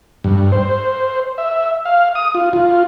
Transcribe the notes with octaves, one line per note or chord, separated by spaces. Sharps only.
G2
C5
E5
F5
D#6
F4
F4